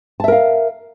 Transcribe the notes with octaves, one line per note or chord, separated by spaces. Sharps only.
A#4 E5 F5 A5